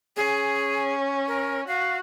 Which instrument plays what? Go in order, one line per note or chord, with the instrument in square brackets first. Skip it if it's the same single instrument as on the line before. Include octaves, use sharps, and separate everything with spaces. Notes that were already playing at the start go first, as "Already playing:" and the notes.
[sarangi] C#4 [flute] G#4
[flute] A#4
[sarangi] F#4 [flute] F5